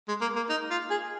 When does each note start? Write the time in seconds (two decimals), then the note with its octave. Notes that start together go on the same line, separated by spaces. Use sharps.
0.08 G#3
0.21 A#3
0.36 A#3
0.49 D#4
0.70 F4
0.90 G#4